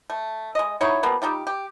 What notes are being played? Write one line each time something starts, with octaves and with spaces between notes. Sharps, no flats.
A3
G#3 D#5
F#3 D#4 E4 C#5
F3 G3 A#3 B3
G3 D#4 F4 G4
G4